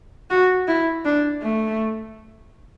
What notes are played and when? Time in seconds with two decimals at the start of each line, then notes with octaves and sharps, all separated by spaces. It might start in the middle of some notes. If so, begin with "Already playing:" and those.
0.30 F#4
0.68 E4
1.05 D4
1.43 A3